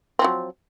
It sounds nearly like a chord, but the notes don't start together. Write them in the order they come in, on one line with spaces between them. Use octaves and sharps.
C4 F3 F#3